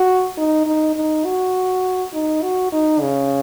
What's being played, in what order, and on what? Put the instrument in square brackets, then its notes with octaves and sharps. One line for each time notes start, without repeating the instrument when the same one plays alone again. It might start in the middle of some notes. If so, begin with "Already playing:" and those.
Already playing: [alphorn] F#4
D#4
D#4
D#4
F#4
D#4
F#4
D#4
C#3